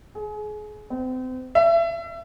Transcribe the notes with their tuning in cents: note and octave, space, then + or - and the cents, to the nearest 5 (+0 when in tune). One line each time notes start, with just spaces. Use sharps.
G#4 +30
C4 -35
E5 +30